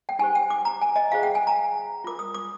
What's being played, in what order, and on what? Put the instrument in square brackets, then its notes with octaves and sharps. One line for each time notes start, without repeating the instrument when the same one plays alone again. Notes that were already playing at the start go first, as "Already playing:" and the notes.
[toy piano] G5
D#4 G4 C5 G#5
G5
D6
A#5
G#5
D#5
F4 G#4 C5 F5
G5
G#5
A#5
F4 A#4 D6
D#6
D6